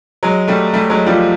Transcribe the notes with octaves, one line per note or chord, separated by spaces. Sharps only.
F#3 G#3
G3 A3
G3 A3
F#3 G#3
F3 G3